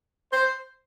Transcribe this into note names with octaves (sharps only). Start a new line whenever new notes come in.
C5